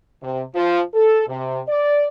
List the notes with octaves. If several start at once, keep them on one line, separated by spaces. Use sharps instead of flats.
C3
F3
A4
C3
D5